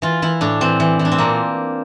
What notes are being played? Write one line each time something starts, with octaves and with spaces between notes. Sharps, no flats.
E3 F4
E3 E4
A2 D4
E3 C4
E3
E3
D4
C4
A#2 A#3